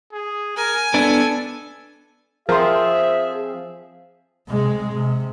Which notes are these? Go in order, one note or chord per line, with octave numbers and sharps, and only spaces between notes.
G#4
A#4 G#5
B3 D4 A4
F3 C4 G#4 A#4 E5 C6
C3 G#3
C3